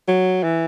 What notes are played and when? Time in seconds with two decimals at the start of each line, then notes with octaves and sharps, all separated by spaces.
0.08 F#3
0.43 E3